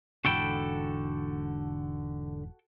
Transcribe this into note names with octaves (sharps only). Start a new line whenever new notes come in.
E1 G#2 D3 E3 F#4 A4 G5 B5